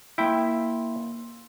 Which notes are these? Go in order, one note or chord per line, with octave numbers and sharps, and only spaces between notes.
A#3 E4 G5 C6 E6